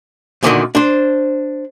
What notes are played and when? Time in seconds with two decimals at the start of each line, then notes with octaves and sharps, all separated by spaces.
0.43 E2 A#2 D3 D#3 F#4 D#5
0.75 D4 C5